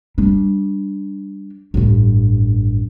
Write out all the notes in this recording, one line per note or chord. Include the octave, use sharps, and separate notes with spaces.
G3 D4
A1 G2